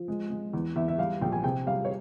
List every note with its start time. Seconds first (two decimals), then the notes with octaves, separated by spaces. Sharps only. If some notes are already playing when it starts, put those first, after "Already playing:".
Already playing: F3
0.08 G#3
0.30 G#3
0.53 E2
0.76 E2 E5
0.88 E5
0.98 G3 F5
1.21 A#1 G5
1.32 G#5
1.44 C3 G5
1.66 G3 F5
1.85 C#5